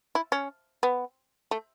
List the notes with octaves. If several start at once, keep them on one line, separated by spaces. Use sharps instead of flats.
E4
C#4
B3
A3